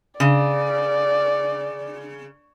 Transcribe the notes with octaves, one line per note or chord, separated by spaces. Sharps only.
C#3 D5